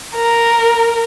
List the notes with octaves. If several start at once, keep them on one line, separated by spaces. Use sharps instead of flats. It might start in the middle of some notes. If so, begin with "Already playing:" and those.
A#4